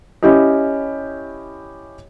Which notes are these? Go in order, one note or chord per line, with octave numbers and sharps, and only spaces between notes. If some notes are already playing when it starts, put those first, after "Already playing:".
C#4 E4 G4 C#5 D#5